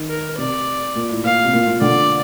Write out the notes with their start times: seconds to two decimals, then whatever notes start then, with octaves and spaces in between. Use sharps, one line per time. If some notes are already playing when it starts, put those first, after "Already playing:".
Already playing: D#3
0.09 A#4
0.38 C3 D5
0.95 A#2
1.10 A2
1.24 A#2 F5
1.44 C3
1.53 A#2
1.67 A#2
1.81 D3 D5